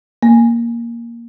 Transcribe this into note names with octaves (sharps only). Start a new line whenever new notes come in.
A#3